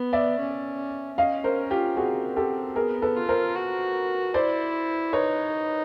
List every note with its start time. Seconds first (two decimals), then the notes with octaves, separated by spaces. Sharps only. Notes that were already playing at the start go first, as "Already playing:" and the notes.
Already playing: B3
0.13 D5 E5
0.40 C#4
1.18 C#4 D#5 F5
1.44 A#4 C5
1.71 F4 G4
1.97 C4 F#4 G#4
2.36 G4 A4
2.76 B3 G#4 A#4
3.02 A4 B4
3.16 F4
3.29 A#4 C5
3.55 F#4
4.34 E4 C5 D5
5.13 D#4 B4 C#5